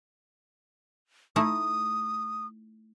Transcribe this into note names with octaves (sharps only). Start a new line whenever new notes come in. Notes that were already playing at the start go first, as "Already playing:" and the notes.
A3 D#4 E4 D#6